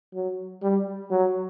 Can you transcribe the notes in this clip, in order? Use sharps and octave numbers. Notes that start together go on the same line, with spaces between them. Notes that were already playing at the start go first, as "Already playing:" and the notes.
F#3
G3
F#3